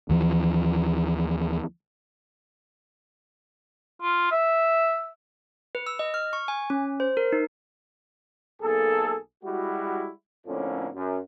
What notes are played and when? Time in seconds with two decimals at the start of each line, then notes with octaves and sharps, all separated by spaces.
0.09 D#2 E3 F3
4.02 F4
4.31 E5
5.75 B4
5.87 E6
5.99 D#5
6.14 F6
6.33 C#6
6.48 G#5
6.70 C#4
7.00 C5
7.17 A#4
7.32 D#4
8.61 B1 A#3 G#4 A4
9.43 G3 G#3 E4 F#4
10.46 F2 A2 D3 F3 A#3 C#4
10.94 F#2